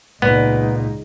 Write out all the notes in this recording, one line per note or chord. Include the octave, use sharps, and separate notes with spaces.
C#2 A#2 B3 D#4